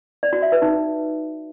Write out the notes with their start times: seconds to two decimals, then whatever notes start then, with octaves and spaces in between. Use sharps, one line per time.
0.23 D5
0.33 F#4
0.42 E5
0.52 B4
0.62 D#4